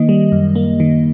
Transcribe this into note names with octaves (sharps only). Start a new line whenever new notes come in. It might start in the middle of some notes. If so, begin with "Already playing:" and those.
Already playing: D#3 A#3 D#5
G3
F#2
A#3
D#3